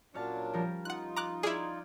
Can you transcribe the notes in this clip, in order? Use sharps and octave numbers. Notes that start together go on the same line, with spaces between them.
A#2 F#3 C#4 D4 F5 A5
F3 G3 A#4
D#4 F4 F#5 F#6
A#5 D6 F#6
E4 G#4 D5 F6 G#6